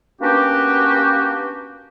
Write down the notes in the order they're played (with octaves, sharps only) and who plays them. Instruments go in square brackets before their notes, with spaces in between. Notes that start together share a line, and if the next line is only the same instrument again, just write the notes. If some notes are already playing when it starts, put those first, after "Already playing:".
[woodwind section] A#3 B3 C#4 D4 F#4 G4